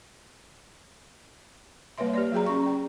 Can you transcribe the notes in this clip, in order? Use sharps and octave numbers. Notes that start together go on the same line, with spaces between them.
G3 A#3 B4 C#5 E5 C6
G4 B4 D5
F#3 F#4 G#4 G5 A#5
C#4 C#6
D5 G5